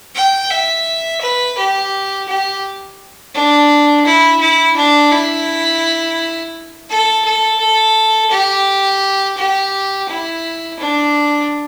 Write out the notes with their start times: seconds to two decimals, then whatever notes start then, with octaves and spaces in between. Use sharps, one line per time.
0.15 G5
0.51 E5
1.22 B4
1.57 G4
2.28 G4
3.35 D4
4.05 E4
4.41 E4
4.77 D4
5.12 E4
6.90 A4
7.25 A4
7.60 A4
8.31 G4
9.38 G4
10.09 E4
10.79 D4